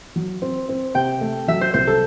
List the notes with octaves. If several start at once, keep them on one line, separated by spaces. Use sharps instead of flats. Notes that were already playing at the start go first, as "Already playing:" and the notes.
F#3
C4
C4
C3 G5
A3
F#3 E5
C5
C2 C5
A4